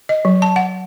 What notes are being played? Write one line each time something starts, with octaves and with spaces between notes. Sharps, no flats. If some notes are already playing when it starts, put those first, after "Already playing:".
D#5
F#3
A5
F#5